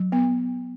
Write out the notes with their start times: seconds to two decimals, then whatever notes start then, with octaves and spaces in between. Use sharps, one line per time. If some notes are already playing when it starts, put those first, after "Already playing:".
Already playing: F#3
0.12 B3